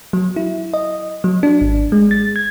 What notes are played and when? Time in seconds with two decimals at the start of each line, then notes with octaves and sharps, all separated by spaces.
0.13 F#3
0.36 E4
0.74 D#5
1.24 F#3
1.43 D4
1.61 G#1
1.92 G#3
2.11 A6
2.36 G#6